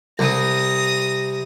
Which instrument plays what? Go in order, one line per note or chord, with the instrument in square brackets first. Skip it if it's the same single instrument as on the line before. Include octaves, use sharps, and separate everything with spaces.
[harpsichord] C2 [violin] D#6 A#6